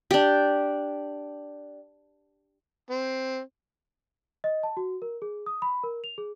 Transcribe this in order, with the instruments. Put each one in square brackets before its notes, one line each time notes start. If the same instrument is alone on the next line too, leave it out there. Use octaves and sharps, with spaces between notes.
[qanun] D4 G4
[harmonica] C4
[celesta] D#5
A5
F#4
A#4
G#4
D#6
B5
A#4
F7
G#4